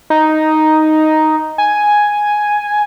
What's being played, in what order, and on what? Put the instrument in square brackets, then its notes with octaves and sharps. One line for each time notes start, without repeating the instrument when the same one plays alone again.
[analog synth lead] D#4
G#5